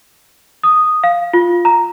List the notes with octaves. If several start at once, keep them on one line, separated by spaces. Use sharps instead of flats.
D#6
F5
F4
A#5